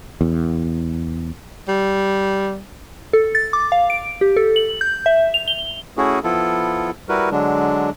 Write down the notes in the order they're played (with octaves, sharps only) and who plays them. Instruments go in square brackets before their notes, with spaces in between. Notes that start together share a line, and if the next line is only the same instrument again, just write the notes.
[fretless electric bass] E2
[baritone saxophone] G3
[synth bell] A4
A6
D6
F5
D7
G4
A4
F#7
G6
E5
F7
G7
[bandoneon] A3 C#4 E4 F#4 G#4
F3 B3 E4 F4 A4
G3 E4 F#4 A#4 B4
D3 F#3 G#3 D4